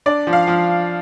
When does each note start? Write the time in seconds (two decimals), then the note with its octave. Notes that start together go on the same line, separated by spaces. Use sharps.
0.06 D4 D5
0.27 F3
0.33 F5
0.48 F3